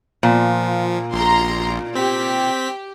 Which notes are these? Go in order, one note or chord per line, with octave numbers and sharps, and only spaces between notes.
A#2 F3
A#1 A#5 C6
C4 G4 B6